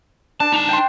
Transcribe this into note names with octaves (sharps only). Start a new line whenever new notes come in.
D4 A5
D#4 A5
G5 C6